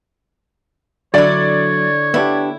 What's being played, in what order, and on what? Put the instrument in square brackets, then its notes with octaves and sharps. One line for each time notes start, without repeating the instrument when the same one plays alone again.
[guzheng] D3 E4 [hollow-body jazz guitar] F#3 [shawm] C#5 [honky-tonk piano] D5
[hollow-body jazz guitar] B3 D4 G4 [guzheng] E4